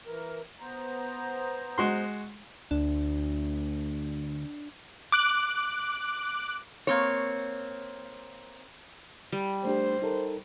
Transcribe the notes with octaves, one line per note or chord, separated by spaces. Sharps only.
E3 A#4
B3 C5 A#5
G#3 F#4 C6
D2 D4
D6 F#6
A#3 C4 C#5
G3
A3 D4 G4 C5
D#4 A4 A#4